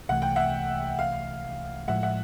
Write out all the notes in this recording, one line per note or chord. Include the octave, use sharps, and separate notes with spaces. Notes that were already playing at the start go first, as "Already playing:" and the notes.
C2 C3 E3 A3 F#5
G5
E5 F#5
F5
A2 F3 G#3 E5 F#5
E5 F#5